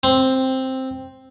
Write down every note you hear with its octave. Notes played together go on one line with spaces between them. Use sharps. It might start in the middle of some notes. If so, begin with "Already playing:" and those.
C4